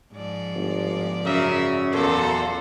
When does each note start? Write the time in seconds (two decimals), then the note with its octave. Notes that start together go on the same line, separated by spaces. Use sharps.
0.13 G#2 F3 D5
0.55 G1
1.25 F#2 C#3 A#4 E5
1.93 E2 A#2 F#4 A4 C5